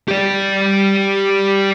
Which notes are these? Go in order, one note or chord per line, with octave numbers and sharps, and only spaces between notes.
G4 D5